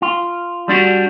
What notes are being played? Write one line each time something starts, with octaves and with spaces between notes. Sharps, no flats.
F4
G3 D4 F#4